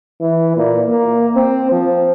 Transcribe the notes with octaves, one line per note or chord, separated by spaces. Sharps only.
E3
A#2
A#3
C4
F3